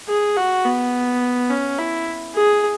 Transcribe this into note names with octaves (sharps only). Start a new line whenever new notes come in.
G#4
F#4
B3
C#4
E4
G#4